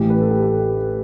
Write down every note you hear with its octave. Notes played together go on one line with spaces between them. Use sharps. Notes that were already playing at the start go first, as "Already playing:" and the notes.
Already playing: A1 A2 E3 G4
B4
A4
G4
A4